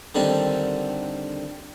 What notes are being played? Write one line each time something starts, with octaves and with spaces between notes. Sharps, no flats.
D3 D#3 G3 C4